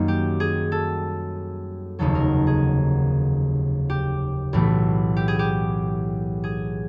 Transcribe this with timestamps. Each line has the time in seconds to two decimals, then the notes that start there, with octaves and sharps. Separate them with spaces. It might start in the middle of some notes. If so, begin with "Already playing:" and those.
Already playing: F#2 D#3 G3 A#3
0.08 G4
0.40 G#4
0.72 A4
1.99 F1 D#2 C#3 F#3 A4
2.15 A#4
2.47 G#4
3.90 G4
4.53 B1 A2 E3 A3
5.17 G4
5.28 G#4
5.39 G4
6.44 G#4